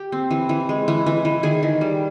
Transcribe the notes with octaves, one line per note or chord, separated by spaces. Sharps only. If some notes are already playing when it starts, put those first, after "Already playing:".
Already playing: G4
C4
E3
E3
G#3
E3
E3
E3
D#3 G#4
D#3
G3